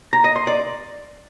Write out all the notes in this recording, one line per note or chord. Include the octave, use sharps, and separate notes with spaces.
A#5
D#5
C6
D5